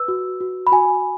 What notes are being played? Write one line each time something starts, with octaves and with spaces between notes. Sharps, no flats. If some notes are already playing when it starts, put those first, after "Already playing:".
Already playing: B4 E6
F#4
F#4
B5
F#4 G#5